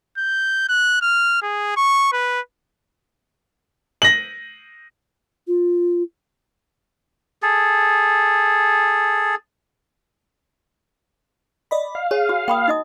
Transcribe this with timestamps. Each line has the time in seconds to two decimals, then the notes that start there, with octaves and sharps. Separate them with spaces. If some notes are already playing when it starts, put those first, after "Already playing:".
0.18 G6
0.69 F#6
1.02 F6
1.42 G#4
1.77 C#6
2.12 B4
4.02 A#6 F#7
5.47 F4
7.42 G#4 A4
11.71 D5 D#5 B5
11.95 F5
12.11 G#4 C#5
12.29 F#4
12.48 A#3 G5 B5 D#6
12.68 D#4 D#5 D#6